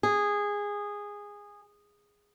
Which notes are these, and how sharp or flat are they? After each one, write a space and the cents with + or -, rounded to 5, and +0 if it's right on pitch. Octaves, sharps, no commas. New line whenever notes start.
G#4 -15